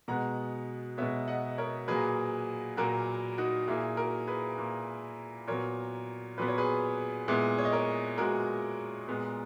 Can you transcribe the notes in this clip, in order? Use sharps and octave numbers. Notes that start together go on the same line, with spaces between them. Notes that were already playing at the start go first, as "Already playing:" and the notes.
B2 G#3 B3 F#5 A#5
B2 G#3 B3 C#5 E5
D#5 F#5
A#4 C#5
A#2 F#3 A#3 G#4 B4
A#2 F#3 A#3 F#4 A#4
D#4 F#4
A#2 A#3 E4 G#4
F#4 A#4
G#4 B4
A#2 A#3
A#2 F#3 B3 A#4 C#5
A#2 F#3 B3 B4
C#5
G#4 B4
A#2 G#3 B3 E4 G#4
C#5
D#5
A#4 C#5
A#2 G#3 B3 F#4 A#4
A#2 G#3 B3